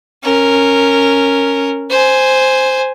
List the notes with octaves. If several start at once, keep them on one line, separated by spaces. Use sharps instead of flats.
C#4 A#4
C5 G#5